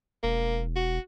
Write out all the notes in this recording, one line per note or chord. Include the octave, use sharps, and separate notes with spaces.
E1 A#3
F#4